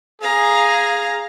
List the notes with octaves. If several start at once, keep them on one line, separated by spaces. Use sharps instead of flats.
G#4 F5 A#5